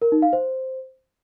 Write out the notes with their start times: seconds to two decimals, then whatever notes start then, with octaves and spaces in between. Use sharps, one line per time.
0.02 A#4
0.12 D#4
0.22 F5
0.33 C5